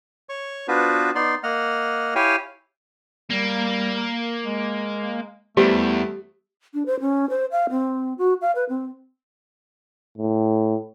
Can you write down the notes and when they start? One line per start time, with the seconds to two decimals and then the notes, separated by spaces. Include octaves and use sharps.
0.29 C#5 C#6
0.68 B3 D4 F4 F#4 B4 C5
1.15 B3 D#4 D5 C6
1.43 A#3 D#5 F#5 F6
2.15 E4 G4 C#5 F5 G5 G#5
3.30 G3 A#3
4.45 G#3
5.57 E2 G3 A3 B3 G4 C5
6.74 D4
6.86 C5
7.00 C#4
7.30 C5
7.52 F5
7.70 C4
8.18 F#4
8.42 F5
8.55 B4
8.69 C4
10.18 A2